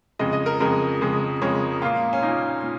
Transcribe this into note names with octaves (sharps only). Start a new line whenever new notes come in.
F2 C#3 G#3 D#5
D#5
A#4
F2 C#3 G#3 A#4
F2 C#3 G#3
F2 C#3 G#3 C#5
A#2 A#3 F4
C#4
A#2 A#3 D#4
A#2